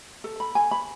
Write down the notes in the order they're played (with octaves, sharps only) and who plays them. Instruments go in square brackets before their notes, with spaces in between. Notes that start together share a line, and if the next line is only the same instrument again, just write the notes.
[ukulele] A4
B5
G#5
B5